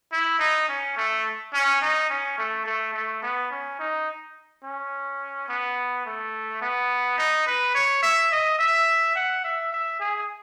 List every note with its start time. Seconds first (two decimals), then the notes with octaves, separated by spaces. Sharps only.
0.13 E4
0.40 D#4
0.69 C#4
0.97 A3
1.54 C#4
1.82 D#4
2.10 C#4
2.38 A3
2.66 A3
2.94 A3
3.23 B3
3.51 C#4
3.79 D#4
4.64 C#4
5.49 B3
6.06 A3
6.62 B3
7.18 D#4
7.47 B4
7.75 C#5
8.03 E5
8.32 D#5
8.59 E5
9.15 F#5
9.44 E5
9.73 E5
10.00 G#4